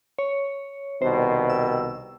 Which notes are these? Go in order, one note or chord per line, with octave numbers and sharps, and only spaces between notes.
C#5
C2 B2 D#3 C5
E6